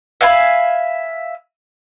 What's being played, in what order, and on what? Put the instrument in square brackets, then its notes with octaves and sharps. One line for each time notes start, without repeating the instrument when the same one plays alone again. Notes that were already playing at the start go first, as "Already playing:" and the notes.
[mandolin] E5 F5 G#5 B5